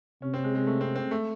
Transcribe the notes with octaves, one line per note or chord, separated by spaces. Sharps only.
C3 C#4
C4
G#3
G#3
A3
C4
C4
A3